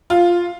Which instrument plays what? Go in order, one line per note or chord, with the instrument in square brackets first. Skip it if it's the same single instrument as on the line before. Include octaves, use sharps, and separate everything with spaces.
[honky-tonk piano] F4